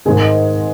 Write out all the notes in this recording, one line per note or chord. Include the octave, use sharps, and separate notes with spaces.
G#2 D#3 G#3 G#4